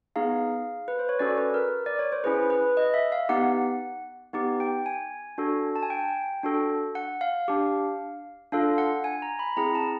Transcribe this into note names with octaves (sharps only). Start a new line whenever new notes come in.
B3 D#4 G#4 F5
B4
C5
C#5
C#4 F#4 A4 D5
B4
A#4
D5
C#5
C5
C#4 E4 G#4 B4
B4
D#5
E5
F5
B3 D#4 G4 F#5
B3 D#4 G4
G5
G#5
D4 F#4 A4
A5
G#5
G5
D4 F#4 A4
F#5
F5
D4 G4
D4 F4 A4 F5
F#5
G#5
A#5
B5
C4 E4 G#4 A#5
A5